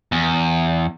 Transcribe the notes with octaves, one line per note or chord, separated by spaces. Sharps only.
E2